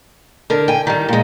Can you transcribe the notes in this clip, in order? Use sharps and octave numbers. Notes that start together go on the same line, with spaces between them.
D3 A#4
G5 G#5
D#3 G3
A#2 G#3